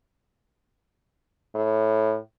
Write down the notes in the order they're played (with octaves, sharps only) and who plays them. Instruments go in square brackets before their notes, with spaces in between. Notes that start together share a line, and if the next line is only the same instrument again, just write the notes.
[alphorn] A2